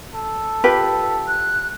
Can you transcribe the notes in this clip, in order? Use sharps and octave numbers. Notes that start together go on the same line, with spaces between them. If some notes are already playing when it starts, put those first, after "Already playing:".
A4
F4 G4 B4
F#6